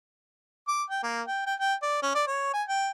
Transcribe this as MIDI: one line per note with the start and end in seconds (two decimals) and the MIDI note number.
0.68 0.83 86
0.90 1.02 79
1.03 1.22 58
1.27 1.43 79
1.46 1.54 79
1.59 1.74 79
1.82 2.00 74
2.02 2.12 61
2.15 2.23 74
2.27 2.49 73
2.53 2.63 80
2.68 2.90 79